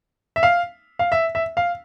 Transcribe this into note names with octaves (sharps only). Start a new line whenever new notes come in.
E5
F5
F5
E5
E5
F5